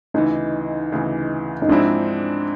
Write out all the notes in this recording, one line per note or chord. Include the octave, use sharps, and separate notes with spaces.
D2 C#3 E3 D#4
D2 C#3 E3
D#4
G#2 F3 G#3 C4 D4 E4